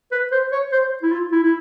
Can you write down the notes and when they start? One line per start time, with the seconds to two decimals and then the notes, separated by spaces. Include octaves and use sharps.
0.12 B4
0.32 C5
0.52 C#5
0.72 C5
1.03 E4
1.12 F4
1.32 E4
1.43 E4